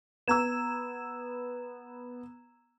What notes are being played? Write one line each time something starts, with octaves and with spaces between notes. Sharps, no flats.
B3 A#5 E6 G#6 E7